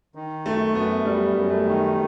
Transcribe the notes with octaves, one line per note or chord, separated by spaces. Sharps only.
D#3
F#2 A3
F#2 B3
F#2 G3
F#2
A3
D#3